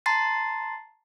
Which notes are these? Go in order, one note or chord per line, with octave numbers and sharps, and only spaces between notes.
A5 A#5 C6 A6 C7